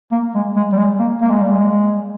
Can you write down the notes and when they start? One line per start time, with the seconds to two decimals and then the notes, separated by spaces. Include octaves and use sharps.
0.12 A#3
0.35 G#3
0.56 G#3
0.72 G3
0.78 G#3
0.99 A#3
1.22 A#3
1.31 G#3
1.41 G3
1.51 G#3